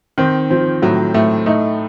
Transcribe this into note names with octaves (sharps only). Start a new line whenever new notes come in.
D#3 C4
F3 C4
A2 F#3
A2 A3
A3 D#4